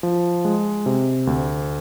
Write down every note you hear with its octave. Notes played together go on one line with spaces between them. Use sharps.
F3
G#3
C3
D2